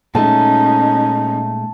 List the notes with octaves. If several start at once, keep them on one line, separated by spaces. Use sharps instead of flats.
A#2 G#3 A3 C#4 D#4 A5